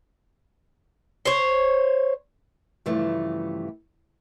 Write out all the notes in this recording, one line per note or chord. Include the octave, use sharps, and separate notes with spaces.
C5 C#5
G2 C#3 E3 F3 A3 G4